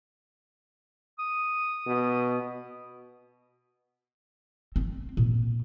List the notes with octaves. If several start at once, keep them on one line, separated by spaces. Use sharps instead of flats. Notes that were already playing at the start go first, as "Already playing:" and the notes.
D#6
B2
C4
A#2